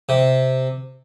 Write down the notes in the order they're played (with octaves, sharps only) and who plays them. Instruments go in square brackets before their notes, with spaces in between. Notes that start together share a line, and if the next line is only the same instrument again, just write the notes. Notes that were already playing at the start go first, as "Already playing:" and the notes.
[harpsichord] C3